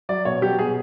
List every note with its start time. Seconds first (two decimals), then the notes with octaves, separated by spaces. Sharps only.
0.09 F#3 D5
0.25 B2 C#5
0.41 F#3 G4
0.59 B2 G#4